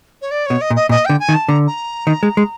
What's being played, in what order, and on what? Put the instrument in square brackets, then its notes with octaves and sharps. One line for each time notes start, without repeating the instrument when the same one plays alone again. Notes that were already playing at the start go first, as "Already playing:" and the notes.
[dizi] C#5
D5
[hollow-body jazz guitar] B2 [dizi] C#5
[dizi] D#5
[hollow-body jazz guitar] A#2
[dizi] D#5
[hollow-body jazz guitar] A#2 [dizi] D#5
[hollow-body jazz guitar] D3 [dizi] G5
[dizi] G#5
[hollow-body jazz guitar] D#3
[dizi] A5
[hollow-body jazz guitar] D3 [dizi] A#5
[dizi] A#5
[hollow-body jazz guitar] D#3
G#3
G#3